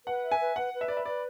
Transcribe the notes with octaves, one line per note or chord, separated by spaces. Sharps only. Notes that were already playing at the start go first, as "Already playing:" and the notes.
B4 F#5
E5
G#5
B4
B4 F#5
B4
E5
D5 B5
E5
B4 D5